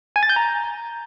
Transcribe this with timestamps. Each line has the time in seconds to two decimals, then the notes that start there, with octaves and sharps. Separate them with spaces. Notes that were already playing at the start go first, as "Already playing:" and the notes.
0.16 G#5
0.23 A6
0.29 G6
0.36 A#5